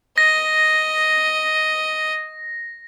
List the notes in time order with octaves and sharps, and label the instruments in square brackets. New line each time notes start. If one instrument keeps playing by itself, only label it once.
[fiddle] D#5 [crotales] A#6